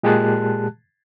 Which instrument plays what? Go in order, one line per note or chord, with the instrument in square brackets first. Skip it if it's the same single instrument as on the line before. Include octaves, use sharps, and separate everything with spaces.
[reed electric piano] A#2 G#3 G4 G#4 A5 F#6